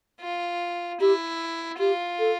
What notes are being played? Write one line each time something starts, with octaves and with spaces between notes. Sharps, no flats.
F4
E4 G4
F4 G4
A4